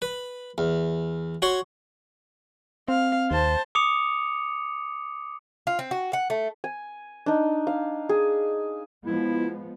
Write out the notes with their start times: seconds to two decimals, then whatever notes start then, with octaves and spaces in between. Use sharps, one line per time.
0.02 B4
0.58 E2
1.42 F#4 C#5 C6 C#6
2.88 C4 F5
3.31 D#2 C5 A5
3.75 D6 D#6 C#7 F7
5.67 F4
5.79 C4
5.91 F#4
6.13 F#5
6.30 A3
6.64 G#5
7.26 D4 D#4
7.67 F5
8.09 G#4
9.06 F3 G#3 B3 E4